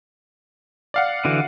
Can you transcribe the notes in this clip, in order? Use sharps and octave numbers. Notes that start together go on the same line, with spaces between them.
D5 F5 F#5
D3 E3 F#4